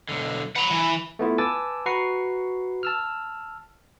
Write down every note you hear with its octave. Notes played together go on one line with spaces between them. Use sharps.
B1 D3
B4 F#5 A#5
E3
A3 B3 E4 F4
B4 G#5 A5 D6 E6 A6
F#4 B4 A#5 C#6 C7
A5 E6 F6